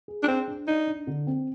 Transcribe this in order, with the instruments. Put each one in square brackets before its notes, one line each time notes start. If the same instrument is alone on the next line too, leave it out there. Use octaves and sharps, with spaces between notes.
[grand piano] G#4
[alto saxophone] D4
[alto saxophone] C4 [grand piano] G#4
[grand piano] D4
[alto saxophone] D#4 [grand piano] D5
[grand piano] D4
D3
C4